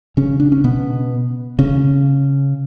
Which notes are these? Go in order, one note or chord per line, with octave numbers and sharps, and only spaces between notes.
C#3 C#4
D4
C#4
B2 B3
C#3 C#4